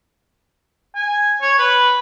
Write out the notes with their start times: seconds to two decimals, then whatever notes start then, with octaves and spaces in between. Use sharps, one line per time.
0.95 G#5
1.42 C#5
1.59 B4